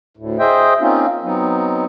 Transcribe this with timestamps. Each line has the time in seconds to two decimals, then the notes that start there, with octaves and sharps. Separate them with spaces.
0.17 D2 A2
0.39 G#4 C5 D#5 E5 G5
0.80 A#3 C4 C#4 D#4 F4
1.23 F#3 B3 C4 D#4